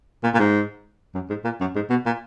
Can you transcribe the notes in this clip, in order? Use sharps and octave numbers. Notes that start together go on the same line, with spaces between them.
A#2
A#2
G#2
F#2
G#2
A#2
F#2
G#2
B2
A#2